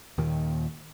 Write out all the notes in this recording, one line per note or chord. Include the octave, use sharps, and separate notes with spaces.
D#2 A#2 D#3